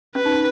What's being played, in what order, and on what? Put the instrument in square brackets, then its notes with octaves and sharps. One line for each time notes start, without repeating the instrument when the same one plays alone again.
[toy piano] C#4 [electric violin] B4
[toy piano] D#4